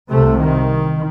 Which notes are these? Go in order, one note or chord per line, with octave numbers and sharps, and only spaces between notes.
C2 C3 A3
D#3